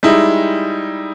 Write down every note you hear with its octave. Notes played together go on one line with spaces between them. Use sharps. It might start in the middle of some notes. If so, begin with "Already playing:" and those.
G3 G#3 D#4 E4